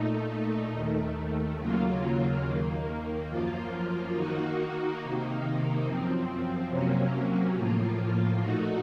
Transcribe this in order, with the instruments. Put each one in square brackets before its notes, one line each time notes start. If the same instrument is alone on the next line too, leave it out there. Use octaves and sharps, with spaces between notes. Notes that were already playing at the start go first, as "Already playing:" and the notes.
Already playing: [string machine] A#2 A3 D#4
D#2 D#3 A3
D#2 C#3 F#3 A#3 F4
D#2 D#3 A#3
F#2 F3 A#3 F4
D#3 A#3 D#4 F#4
C3 D#3 A#3 D#4
F#2 F3 C4
C3 F#3 A#3 C#4
A2 F3 A#3 F4
A#2 A3 D#4 F#4